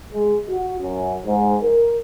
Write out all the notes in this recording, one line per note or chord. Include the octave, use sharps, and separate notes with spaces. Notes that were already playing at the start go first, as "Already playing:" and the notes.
G#3
F#4
F#2
G#2
A#4